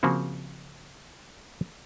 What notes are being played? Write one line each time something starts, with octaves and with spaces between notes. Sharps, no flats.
C#3 F3 A#3 C4 F#4